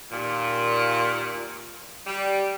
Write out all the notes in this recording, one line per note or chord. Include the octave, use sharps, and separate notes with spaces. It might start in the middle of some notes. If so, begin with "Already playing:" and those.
D#2 A#2
G3